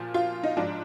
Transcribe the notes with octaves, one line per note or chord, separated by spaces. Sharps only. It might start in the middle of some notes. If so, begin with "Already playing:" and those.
Already playing: A#2 F3
F4
D#4
G#2 F3 D4